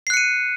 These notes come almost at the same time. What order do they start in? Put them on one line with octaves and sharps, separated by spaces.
C7 F#6 C#7 D#7